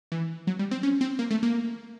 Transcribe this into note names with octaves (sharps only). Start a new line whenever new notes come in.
E3
F#3
G3
C4
C#4
C4
A#3
A3
A#3